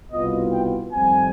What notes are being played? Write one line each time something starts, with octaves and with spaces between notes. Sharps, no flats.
C2 B2 B3 F4 D#5
G5
F2 D#3 G3 C4 G#5